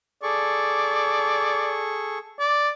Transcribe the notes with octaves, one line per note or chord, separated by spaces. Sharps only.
G#4 A4 D5 C#6
D5